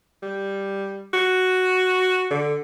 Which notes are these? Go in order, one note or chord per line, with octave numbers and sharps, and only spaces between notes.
G3
F#4
D3